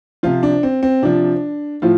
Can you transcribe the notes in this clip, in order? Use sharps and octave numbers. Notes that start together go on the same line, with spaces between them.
C3 F3 F4
D4
C4
C4
C3 F3 D4
A2 F3 F4